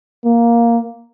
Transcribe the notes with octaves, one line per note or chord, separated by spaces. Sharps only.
A#3